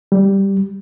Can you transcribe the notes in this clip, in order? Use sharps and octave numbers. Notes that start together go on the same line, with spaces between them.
G3